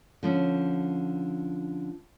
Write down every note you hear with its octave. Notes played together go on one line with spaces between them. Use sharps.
D3 F3 C#4